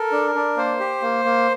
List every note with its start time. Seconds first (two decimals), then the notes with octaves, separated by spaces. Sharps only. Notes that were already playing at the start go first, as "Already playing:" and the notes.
Already playing: A4 A#4
0.12 D4
0.35 D4
0.57 A#3 C5
0.80 G4
1.02 A#3
1.25 A#3